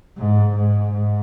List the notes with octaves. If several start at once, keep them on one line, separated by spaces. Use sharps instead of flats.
G#2
G#2
G#2